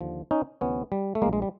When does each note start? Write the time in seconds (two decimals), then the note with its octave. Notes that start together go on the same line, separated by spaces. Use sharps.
0.01 D#2 D3 F3
0.31 C#4 D#4
0.61 D2 C3 E3 B3 C#4
0.92 G3
1.15 A3
1.22 A#1 A2 E3 G#3 A#3
1.33 G#3
1.42 G3